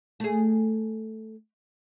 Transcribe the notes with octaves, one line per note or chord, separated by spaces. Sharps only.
A3 G#4